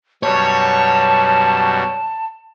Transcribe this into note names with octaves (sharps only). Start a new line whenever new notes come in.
F#2 B2 G3 C#5 A5